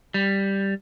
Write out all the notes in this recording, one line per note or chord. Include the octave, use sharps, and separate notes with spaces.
G3